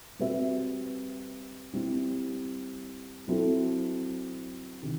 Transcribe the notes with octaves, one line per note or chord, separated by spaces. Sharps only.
G3 C4 F#4 B4 E5
G3 C4 E4
F#3 C4 E4 A4
C3 D#3